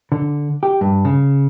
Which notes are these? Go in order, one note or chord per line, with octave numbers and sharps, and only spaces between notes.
D3
G4
G2
C#3